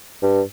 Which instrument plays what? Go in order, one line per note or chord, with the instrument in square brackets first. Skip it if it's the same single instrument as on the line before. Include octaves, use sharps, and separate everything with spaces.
[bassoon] G2